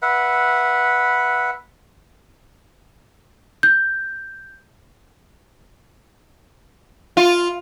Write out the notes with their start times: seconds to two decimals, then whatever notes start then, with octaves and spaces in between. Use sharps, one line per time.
0.02 B4 E5 F#5
3.63 G6
7.17 F4